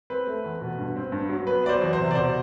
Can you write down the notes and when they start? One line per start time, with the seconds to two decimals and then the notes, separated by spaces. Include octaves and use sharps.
0.10 C4 B4
0.27 A3
0.44 E2
0.61 B2
0.78 G2
0.96 C4
1.12 G2
1.29 F#3
1.47 B3 B4
1.63 F#3 D5
1.69 C5
1.82 E2
1.93 C5
1.98 C3
2.11 D5
2.15 B2 C5